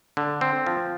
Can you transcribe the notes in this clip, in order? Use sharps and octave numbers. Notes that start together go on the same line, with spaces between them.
D3
C4
F3